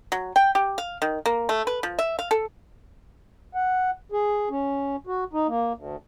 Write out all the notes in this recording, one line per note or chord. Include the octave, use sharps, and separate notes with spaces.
F#3
G5
G4
F5
D#3
A#3
A3
B4
F3
E5
F5
A4
F#5
G#4
C#4
F#4
D#4
A#3
D2